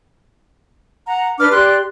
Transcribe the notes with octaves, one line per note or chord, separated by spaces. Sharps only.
F#5 A#5
D4 B4 D6 F6
G4 D5 C6 F#6